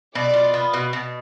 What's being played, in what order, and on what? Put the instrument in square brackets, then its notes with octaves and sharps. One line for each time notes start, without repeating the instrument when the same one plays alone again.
[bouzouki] B2 [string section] D5
[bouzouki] F4
B3
B2
B2